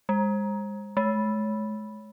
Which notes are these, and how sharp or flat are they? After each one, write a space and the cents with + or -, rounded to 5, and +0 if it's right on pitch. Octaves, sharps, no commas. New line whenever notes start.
G#3 -30
G#3 +45